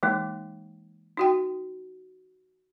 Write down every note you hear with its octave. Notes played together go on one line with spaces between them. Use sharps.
E3 G#3 A#3 D#4
D#4 F#4 G5